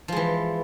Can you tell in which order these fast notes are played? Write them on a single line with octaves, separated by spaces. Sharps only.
F3 G#3 E3